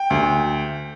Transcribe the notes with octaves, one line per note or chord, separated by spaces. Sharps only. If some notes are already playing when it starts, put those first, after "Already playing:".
Already playing: G5
D2